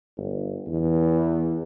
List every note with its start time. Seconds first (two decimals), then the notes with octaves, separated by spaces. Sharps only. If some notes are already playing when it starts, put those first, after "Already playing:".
0.17 G1
0.66 E2